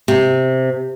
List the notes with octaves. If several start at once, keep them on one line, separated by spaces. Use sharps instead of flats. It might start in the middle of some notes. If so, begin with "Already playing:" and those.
C3